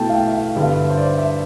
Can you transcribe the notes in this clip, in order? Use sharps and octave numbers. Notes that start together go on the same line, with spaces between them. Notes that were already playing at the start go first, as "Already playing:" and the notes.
Already playing: B2 A3 E4 G5 A5
F5
G5
E5
F5
G2 D3 G3 E5
C5
D5
E5